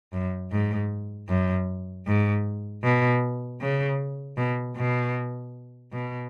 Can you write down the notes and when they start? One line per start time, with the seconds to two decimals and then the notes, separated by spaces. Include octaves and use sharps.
0.13 F#2
0.52 G#2
1.29 F#2
2.07 G#2
2.83 B2
3.61 C#3
4.37 B2
4.77 B2
5.92 B2